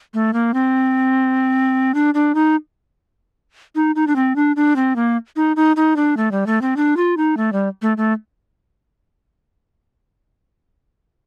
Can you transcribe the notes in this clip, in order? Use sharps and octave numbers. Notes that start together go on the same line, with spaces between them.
A3
A#3
C4
D4
D4
D#4
D#4
D#4
D4
C4
D4
D4
C4
A#3
D#4
D#4
D#4
D4
A3
G3
A3
C4
D4
F4
D#4
A3
G3
A3
A3